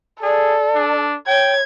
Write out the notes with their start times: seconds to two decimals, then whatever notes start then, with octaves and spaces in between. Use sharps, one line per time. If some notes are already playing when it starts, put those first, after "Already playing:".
0.23 G#4 A4 D5
0.75 D4
1.27 C#5 G5 G#6